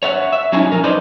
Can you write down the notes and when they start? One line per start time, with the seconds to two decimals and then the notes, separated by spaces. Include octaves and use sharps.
0.03 C#5 E5 F#5
0.32 E5
0.52 F#3 C#4 D#4 E4 G#5
0.72 F3 A#4
0.84 D#4 B4 C5 D5 D#5